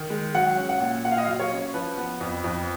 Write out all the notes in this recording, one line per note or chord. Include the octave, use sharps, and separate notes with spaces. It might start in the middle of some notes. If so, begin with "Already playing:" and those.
Already playing: D#3
G#3
F#3 F#5
C#4
F#5
A#2
A#2 F#5
F5
D#5
F#3 F5
C#5
C#4
F3 B4
B3
F2
F2